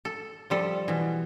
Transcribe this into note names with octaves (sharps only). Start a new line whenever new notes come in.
A4
F3 G3 A4
B2 E3